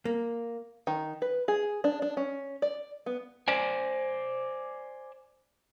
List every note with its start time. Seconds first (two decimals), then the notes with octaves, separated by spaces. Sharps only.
0.05 A#3
0.87 D#3
1.22 B4
1.48 G#4
1.84 D4
2.02 D4
2.17 C#4
2.62 D5
3.06 B3
3.48 C5 D5 G#5